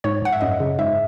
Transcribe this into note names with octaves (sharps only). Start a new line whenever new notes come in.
G#2 C#5
G#2 F#5
E5
F#2 D#5
C#3
G#2 E5